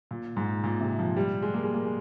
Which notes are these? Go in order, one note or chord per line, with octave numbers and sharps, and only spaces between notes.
A#2
G#2
A#2
C3
F3
G3
G#3
A#3
G#3
A#3
G#3